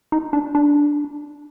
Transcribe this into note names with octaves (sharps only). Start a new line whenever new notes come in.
D#4
D4
D4